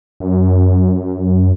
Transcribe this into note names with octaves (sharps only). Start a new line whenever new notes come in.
F#2